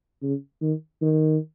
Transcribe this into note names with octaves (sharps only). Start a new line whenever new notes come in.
C#3
D#3
D#3